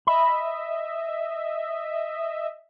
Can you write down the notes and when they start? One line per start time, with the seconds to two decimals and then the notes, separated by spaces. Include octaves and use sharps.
0.07 D#5 E5 B5